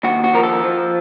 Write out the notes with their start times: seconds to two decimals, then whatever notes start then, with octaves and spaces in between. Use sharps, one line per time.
0.04 D#2 F#4
0.24 F#4
0.33 F3 A#4
0.43 A4
0.64 F3